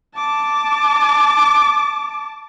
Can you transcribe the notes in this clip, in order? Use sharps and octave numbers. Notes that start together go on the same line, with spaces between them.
A5 D6